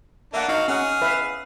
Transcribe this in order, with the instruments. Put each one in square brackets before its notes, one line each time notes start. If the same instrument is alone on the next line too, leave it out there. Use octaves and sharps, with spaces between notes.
[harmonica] A#3 D4 [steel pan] E5 F#5
[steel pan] D#4 [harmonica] F#4 F5
[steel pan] C#4 F#5 [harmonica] G#4 F6
[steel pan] B4 E5 F5